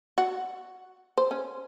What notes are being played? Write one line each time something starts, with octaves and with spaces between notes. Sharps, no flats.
F#4
C5
C#4